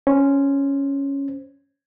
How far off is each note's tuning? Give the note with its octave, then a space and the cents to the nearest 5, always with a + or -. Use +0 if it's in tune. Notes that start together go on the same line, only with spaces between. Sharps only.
C#4 +0 C5 +0